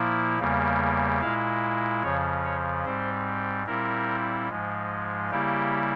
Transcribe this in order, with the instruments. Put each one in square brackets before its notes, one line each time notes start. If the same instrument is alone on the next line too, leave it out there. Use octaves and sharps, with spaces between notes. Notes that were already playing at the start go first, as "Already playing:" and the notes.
Already playing: [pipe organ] A#2 F3 A#3 E4
E2 C#3 G3 A#3
A#2 G#3 E4 F5
F2 C#3 F3 C#5
C#5
G#2 G3 C4 C5
A#2 G3 C4 E4 A#4
G#2 F3 G#3
C#3 G3 A#3 E4 G4